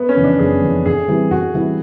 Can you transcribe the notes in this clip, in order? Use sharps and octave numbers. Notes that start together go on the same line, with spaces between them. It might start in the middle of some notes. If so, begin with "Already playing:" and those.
Already playing: B3
C#4
F2 C#3 E3
D4
F#1 G#4
F2 C#3 E3
A2 G#4
E3 G3 C4 E4
A2 F#4
E3 G3 C4 E4